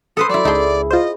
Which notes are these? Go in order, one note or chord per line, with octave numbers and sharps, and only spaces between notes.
A4 B4 C5 D#6
F#3 E4 D5 A5
C#2 D#4 E4 G#4 A4 G6
F4 C5 D#5